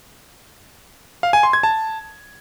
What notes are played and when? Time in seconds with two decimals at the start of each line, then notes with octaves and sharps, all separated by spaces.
1.23 F5
1.33 G#5
1.43 C6
1.53 G#6
1.63 A5